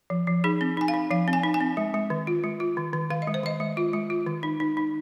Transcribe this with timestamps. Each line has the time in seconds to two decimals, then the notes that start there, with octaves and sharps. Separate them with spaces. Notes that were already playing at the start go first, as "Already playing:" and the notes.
0.10 F3
0.27 F3
0.44 D#4 G#4
0.61 C4
0.77 D#4 G#5
0.88 F5
0.94 D#4
1.11 F3 F5
1.28 C4
1.33 G#5
1.44 D#4
1.54 G#5
1.61 C4
1.77 G#3
1.94 G#3
2.10 D#3
2.27 F4
2.44 G#3
2.60 F4
2.77 D#3
2.93 D#3
3.10 D#3 F5
3.22 D#5
3.27 G#3
3.34 C5
3.43 D#3 D#5
3.60 G#3
3.77 F4
3.93 G#3
4.10 F4
4.26 D#3
4.43 D#4
4.60 D#4
4.77 D#4